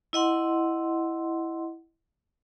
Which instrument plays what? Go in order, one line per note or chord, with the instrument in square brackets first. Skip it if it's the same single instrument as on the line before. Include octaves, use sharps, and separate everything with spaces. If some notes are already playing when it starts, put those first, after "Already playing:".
[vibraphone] E4 D#5 F#5 C6